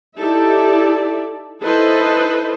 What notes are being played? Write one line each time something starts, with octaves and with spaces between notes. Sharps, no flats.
D#4 E4 G4 A4 D5 E5
D#4 E4 A4 B4 C5 D#5